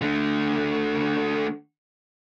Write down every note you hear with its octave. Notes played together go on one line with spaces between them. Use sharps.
D3 A3